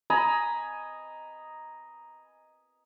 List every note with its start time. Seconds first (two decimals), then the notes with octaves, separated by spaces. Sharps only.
0.10 D#5 G#5 A#5 B5